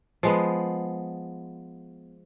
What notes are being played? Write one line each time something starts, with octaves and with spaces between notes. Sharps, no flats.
F3 G#3 B3